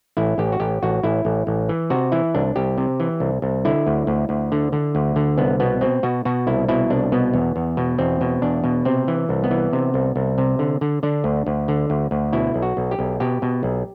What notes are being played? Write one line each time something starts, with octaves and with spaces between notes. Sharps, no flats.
A1 E4
A1 G4
F#4
A1 G4
A1 F#4
A1 E4
A1
A1
E3
C3 F#4
E3 E4
C2 D4
C2 G4
C3
E3
C2
C2
D3 E4
D2
D2
D2
D3
D3
D2
D3
C2 B3
B2 B3
B2 C4
B2 F#4
B2 F#4
C2 E4
B2 E4
C2 D4
B2 B3
E2
E2
B2
E2 C4
B2
E2 D4
B2
C3 C4
E3
C2
B3
E3
C3
C2
C2
C3
D3
D3
D3 D4
D2
D2
D3
D2
D2
B2 E4
B1
F#4
B1
G4
B1
B2 G4
B2
B1